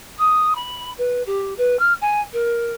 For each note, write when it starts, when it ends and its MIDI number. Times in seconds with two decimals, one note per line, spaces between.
0.18 0.55 87
0.55 0.90 83
0.98 1.24 71
1.26 1.53 67
1.58 1.78 71
1.79 1.93 89
2.01 2.21 80
2.33 2.75 70